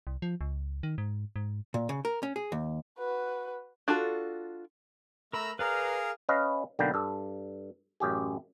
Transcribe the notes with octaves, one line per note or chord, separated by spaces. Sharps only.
C2
F3
C#2
D#3
G#2
G#2
A#2
C#3
A#4
C#4
G#4
D#2
F#4 B4
D4 F4 F#4 A4
A3 A#4 A#5 B5 E6
G#4 A#4 B4 D5 F5 A#5
C#4 B4 D#5 F5
B1 D3 A#3 B4 G5
G2 A4
A1 F#2 G4 G#4